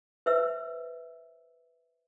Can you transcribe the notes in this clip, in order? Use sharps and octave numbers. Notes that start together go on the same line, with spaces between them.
B4 C5 E5 E6